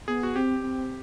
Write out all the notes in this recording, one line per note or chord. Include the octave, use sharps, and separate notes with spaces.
B3 G#4
F#4
C4 G4
C4